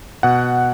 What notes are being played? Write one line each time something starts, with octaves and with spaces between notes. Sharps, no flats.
B2 F#5